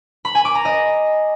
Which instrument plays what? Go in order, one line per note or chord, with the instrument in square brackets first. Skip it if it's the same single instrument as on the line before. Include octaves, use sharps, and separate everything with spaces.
[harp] B5
G#5
D6
A#5
D#5